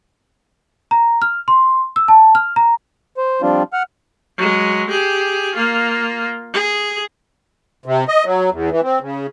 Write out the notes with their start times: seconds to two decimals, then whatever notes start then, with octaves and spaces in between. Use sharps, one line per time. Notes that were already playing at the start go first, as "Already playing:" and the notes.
0.91 A#5
1.22 F6
1.48 C6
1.96 E6
2.08 A5
2.35 F6
2.56 A#5
3.17 C5
3.42 F3 G3 C4 D4 F4
3.73 F#5 F6
4.38 F#3 G#3
4.90 G4 G#4
5.55 A#3 F4
6.54 G#4
7.86 C3
8.08 D#5
8.25 F#3
8.52 E2
8.71 E3
8.83 C4
9.01 C#3